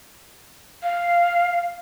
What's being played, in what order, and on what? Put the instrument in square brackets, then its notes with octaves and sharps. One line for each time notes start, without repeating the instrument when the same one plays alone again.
[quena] F5